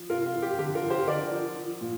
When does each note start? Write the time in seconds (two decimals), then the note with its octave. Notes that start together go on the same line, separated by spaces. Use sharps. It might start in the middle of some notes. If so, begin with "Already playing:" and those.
Already playing: F3
0.09 C3 F4 A#4
0.26 F4
0.33 F3
0.42 G4
0.59 D3 G4
0.74 F4 A#4
0.82 F3
0.90 G4 C5
1.07 D3 A#4 D5
1.31 F3
1.56 F3
1.81 A#2